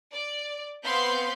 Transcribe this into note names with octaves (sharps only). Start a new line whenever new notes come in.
D5
B3 C4 F5 B5 C6 G6